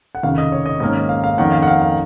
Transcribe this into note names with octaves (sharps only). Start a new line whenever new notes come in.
F#5
F1 D#2 C#3 F5
D#5
C#5
D#5
G#2 D#3 A#3 C#4 D#5
D#5
F5
F5
F2 D#3 A#3 C#4 F#5
F5
F#5
F5
F5